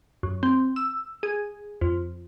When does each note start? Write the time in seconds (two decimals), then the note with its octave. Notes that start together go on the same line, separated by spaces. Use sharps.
0.23 F#2
0.43 C4
0.76 E6
1.23 G#4
1.81 F2